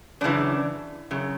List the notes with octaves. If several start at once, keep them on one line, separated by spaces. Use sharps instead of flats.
F#2 C#3 E3 D4
F#2 C#3